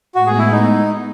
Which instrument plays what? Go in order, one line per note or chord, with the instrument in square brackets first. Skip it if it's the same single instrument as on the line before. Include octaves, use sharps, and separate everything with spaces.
[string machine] A2 G#3 B3 [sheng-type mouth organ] F#4
[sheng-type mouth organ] G#4
E4
D#4